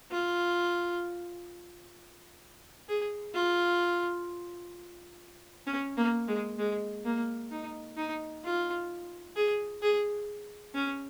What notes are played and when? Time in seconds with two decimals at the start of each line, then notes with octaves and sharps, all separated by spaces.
0.11 F4
2.89 G#4
3.35 F4
5.67 C#4
5.97 A#3
6.28 G#3
6.59 G#3
7.05 A#3
7.52 D#4
7.97 D#4
8.44 F4
9.36 G#4
9.82 G#4
10.75 C#4